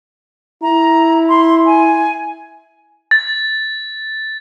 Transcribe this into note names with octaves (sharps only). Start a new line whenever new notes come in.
E4 A#5
C6
G#5
A6